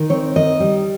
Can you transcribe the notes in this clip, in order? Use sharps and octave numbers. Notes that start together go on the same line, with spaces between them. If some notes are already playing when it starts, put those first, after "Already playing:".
Already playing: D#3
C4 C#5
D#3 D#5
G3